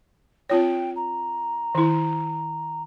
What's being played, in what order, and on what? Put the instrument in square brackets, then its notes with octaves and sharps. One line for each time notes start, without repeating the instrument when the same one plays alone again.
[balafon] C4 F4 C#5 [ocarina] G5
[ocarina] A#5
[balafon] D#3 E4